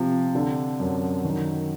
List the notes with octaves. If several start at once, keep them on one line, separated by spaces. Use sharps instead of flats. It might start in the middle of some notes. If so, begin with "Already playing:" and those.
Already playing: C3 F3
D3
F#2
D#3